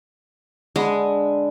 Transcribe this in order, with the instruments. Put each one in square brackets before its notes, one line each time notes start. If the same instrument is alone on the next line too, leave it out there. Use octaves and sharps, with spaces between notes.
[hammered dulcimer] D3 G#5 B5 [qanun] G#3